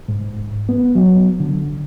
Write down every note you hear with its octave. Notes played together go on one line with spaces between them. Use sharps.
G#2
B3
F#3
D3